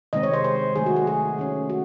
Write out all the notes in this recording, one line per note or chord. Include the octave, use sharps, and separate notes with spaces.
C3 D#3 G#3 C4 D#5
C#5
C5
C5
D#3 F#3 A3 G#4
F#4
G#4
G#4
D#3 A3 C#4
F#4